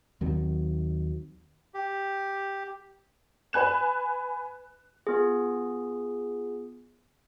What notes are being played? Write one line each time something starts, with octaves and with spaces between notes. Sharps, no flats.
D#2 D#3 F#3 C4
G4
B4 G#5 F#6 E7
B3 F4 G#4